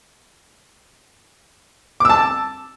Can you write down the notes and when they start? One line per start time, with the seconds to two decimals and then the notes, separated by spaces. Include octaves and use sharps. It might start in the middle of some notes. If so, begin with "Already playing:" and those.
2.00 D6
2.05 E6
2.09 A5